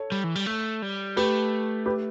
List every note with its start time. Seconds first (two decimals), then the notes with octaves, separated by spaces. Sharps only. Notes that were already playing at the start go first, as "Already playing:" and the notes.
Already playing: A4 C#5
0.12 G3
0.24 E3
0.36 G3
0.46 A3
0.82 G3
1.16 A3 G4 B4
1.86 G4 B4